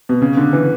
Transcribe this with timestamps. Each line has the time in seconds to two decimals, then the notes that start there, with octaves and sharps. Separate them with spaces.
0.09 B2
0.22 C#3
0.37 D3
0.53 E3